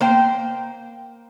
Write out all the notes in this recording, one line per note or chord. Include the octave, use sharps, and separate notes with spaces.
A#3 C5 G5